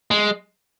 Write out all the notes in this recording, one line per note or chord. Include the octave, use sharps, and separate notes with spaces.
G#3